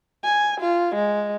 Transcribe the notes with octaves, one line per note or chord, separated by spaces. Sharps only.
G#5
F4
G#3